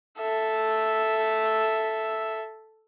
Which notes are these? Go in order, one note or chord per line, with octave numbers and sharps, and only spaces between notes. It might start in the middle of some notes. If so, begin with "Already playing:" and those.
A4 E5